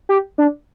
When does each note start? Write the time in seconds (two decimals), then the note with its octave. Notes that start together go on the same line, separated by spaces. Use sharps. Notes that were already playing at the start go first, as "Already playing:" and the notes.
0.09 G4
0.38 D4